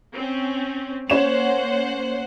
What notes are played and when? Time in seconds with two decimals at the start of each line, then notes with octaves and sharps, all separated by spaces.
0.15 C4 C#4
1.10 A#3 C#4 C5 C#5 F#5 E7